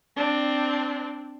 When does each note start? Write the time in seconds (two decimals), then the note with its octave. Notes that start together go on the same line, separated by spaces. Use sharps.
0.16 C4 D4